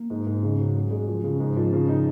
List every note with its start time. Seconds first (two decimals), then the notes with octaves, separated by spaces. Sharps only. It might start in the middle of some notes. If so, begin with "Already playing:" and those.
Already playing: A#3
0.10 G#2
0.27 G#2
0.42 C#3
0.59 F#3
0.75 G#3
0.91 G#3
1.07 F3
1.24 C#3
1.40 G#2
1.57 F3
1.73 C#3
1.89 D#4